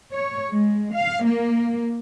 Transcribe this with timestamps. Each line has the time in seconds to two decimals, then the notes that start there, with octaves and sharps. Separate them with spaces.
0.12 C#5
0.51 G#3
0.94 F5
1.25 A#3